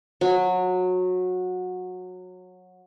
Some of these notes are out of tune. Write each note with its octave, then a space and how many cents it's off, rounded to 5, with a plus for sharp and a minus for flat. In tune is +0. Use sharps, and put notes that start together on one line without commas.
F#3 -20